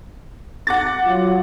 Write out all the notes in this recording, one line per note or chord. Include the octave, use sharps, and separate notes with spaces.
F#5 D6 A6
F#3 F4